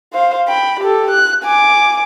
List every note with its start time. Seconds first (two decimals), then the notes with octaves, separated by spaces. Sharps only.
0.13 C5 F5
0.48 G5 B5
0.80 G4 A4
1.10 F#6
1.44 G#5 D6